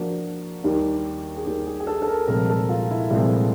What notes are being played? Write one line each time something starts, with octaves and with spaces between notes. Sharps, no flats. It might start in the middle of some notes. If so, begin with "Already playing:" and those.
Already playing: F3 A#3 D4 F#4
D#2 D#3 G3 A#3
G#4
D#2 D#3 G3 A#3 G4
G#4
G#4
A4
A4
A#4
C2 A#2 F3 G#3 C4 A#4
A4
F4
E4
C2 A#2 F3 G#3 C4 A4